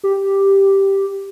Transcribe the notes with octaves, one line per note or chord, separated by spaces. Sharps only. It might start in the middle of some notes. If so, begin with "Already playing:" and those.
G4